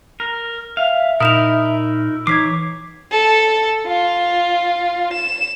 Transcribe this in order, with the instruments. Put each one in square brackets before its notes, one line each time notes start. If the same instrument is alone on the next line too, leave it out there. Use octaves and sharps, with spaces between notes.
[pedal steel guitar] A#4
[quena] E5 [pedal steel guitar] F5
[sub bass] A#2 [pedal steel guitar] D#4 E4 A#4 [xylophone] D#6 E7 F7
[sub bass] E3 [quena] D#4 [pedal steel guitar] C#5 D6 [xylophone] G#6 B6 C7
[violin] A4
F4
E7